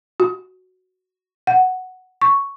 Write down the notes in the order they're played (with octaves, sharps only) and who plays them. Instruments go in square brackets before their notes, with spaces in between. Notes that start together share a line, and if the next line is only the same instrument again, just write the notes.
[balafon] F#4
F#5
C#6